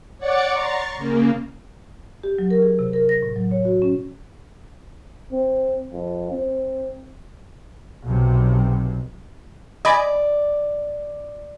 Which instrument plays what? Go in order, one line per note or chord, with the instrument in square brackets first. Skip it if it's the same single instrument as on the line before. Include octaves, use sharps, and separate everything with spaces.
[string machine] C#5 D5 F#5 D6 A6 C#7
A#5 C6 C#6 A6
C#3 A#3
[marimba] G4
F#3
A#4
G#4
C3
A#4
A#6
A2
F#3
C#5
F#4
C#4
[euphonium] C4
F2
C4
[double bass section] B1 C3
[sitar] D5 [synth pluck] D#5 G#5 B5